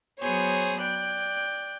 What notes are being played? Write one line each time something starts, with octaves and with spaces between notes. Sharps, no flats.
F#3 B3 G#4 C5 C#5
D5 G5 F#6